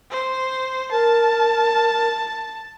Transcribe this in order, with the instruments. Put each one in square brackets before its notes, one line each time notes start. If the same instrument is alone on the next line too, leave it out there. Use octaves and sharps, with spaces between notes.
[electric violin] C5
[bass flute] A#4 [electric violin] A5